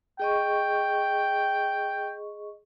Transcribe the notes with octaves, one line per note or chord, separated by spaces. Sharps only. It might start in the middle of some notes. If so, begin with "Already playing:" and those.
G#4 D#5 G5 C#6